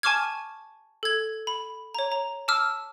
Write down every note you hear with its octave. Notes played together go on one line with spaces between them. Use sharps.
G#5 A5 C#6 D6 F6 G#6
A4 G#6
B5
C#5 A#5
A#5
A5 D6 E6 F6